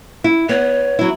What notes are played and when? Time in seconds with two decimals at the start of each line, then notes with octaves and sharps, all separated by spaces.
0.24 E4
0.49 B3 C#5
0.99 F#3 E4